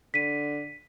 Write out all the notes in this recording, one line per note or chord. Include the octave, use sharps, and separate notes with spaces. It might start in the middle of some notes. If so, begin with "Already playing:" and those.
D3 B6 D#7